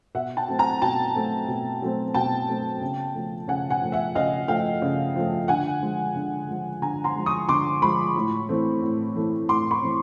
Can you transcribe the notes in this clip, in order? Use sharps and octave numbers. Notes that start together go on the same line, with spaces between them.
B2 E5 F#5
G5 A5
F#3 A3 C4
G#5 A#5
B2 G5 A5
F#3 A3 C4
B2
F#3 A3 C4
B2 G5 A5
F#3 A3 C4
C#3
F3 A3
C#3 F#5 G#5
F#5 G#5
F3 A3
E5 F#5
C#3 D#5 F5
F3 A3 F5 G5
C#3
F3 A3
D3 F#5 G#5
F3 G#3
D3
F3 G#3
D3 G#5 A#5
A#5 C6
F3 G#3
C#6 D#6
D3 C6 D6
F3 G#3 B5 C#6
A2
E3 A3 C4
A2
E3 A3 C4
A2 C6 D6
B5 C#6
E3 A3 C4